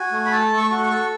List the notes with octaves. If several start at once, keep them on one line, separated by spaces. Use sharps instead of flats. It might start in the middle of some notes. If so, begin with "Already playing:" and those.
Already playing: F#4 G#5
A3
B5
A4 A5
A3
C#6
F#4
C#6
A4